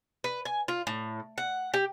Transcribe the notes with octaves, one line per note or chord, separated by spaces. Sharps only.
B4
G#5
F4
A2
F#5
G4